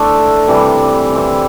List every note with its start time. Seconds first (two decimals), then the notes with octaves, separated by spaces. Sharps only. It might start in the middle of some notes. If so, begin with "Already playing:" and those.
Already playing: A3 D4 E4 C5 E5
0.48 C3 E3 G3
1.15 E3 C4 E4